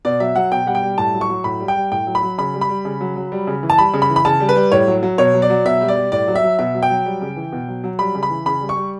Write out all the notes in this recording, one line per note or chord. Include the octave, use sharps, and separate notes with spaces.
B2 D5
F#3 E5
F#3 F#5
B2 G5
G3 F#5
G5
G3
A2 A5
F#3
C#6
F#3
A2 B5
G3
G5
G3
A2 G5
F#3
B5
F#3
C#3 B5
G3
B5
G3
C#3
F#3
F#3
G3
C#3
E3
A5
G3 B5
C#3
B5
E3
B5
C#3 A5
G3
B4
G3
A2 C#5
F#3
F#3
B2 C#5
F#3
D5
F#3
B2 E5
G3
D5
G3
A2 D5
F#3
E5
F#3
B2 E5
F#3
G5
F#3
G3
C#3
E3
B2
F#3
F#3
G3 B5
C#3
B5
E3
C#3 B5
G3
C#6
G3